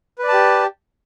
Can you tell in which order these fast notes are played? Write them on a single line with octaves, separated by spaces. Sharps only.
B4 D5 A5 G4